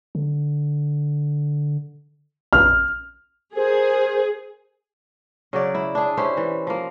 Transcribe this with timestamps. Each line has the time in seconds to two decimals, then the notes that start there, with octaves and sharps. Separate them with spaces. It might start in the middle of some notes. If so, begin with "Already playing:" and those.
0.15 D3
2.53 A#1 F6
3.57 G#4 A#4 C5
5.53 C#3 F#3 D5
5.75 E4
5.95 D4 G#4
6.17 C#4 E4 G4 C5
6.37 E3
6.67 F3 A#3